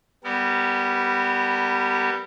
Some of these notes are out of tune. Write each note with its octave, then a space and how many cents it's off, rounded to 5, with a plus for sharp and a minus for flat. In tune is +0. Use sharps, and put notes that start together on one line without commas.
G3 +0 B3 +0 A#4 -35